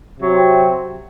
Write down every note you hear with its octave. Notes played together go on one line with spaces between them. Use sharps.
C3 F#3 C4